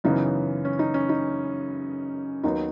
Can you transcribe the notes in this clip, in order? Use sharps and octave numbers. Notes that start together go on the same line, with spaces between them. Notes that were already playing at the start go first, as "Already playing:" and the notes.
F#2 C#3 E3 B3 D#4
C#4
D#4
C#4
D#4
D#2 D#3 F#3 B3 D#4